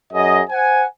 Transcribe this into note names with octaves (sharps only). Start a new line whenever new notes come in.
F#2 G#4 D#5
C5 F#5 G#5